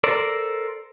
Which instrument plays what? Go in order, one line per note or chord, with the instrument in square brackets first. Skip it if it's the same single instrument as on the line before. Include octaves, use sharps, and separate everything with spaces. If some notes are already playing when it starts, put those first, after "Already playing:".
[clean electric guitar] A4 A#4 C5 D5